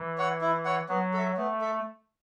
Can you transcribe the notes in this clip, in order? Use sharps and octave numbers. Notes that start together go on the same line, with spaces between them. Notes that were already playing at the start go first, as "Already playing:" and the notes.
Already playing: E3
C#5 F#5
E4
C#5 F#5
F#3 B3
A4 E5
A3 B3
A4 E5